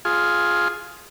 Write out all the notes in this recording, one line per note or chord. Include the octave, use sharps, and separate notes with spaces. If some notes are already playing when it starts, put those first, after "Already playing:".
F4 G#4